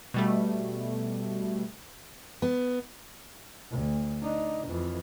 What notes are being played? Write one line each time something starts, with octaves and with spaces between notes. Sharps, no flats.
B2 G3 A3
B3
D2
D4 D#4
F2 E3